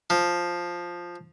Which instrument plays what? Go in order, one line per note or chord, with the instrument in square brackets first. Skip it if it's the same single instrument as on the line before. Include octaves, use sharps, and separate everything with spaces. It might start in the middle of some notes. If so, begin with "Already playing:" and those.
[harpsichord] F3